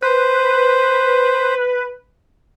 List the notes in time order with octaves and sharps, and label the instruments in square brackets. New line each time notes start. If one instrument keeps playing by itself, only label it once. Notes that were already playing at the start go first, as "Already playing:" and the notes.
[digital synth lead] B4 [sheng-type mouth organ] C5